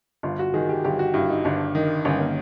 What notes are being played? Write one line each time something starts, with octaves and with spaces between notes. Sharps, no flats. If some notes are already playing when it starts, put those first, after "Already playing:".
G1 F4
F#4
D#3 G#4
G4
G1 G4
F#4
G2 E4
D#4
G1 D4
D#3
G1 C#4
A#3